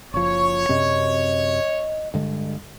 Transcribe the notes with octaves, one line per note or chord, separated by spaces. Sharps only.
F#1 F3 C#5 C#6
F#2 C3 C4 D#5
G2 D3 G#3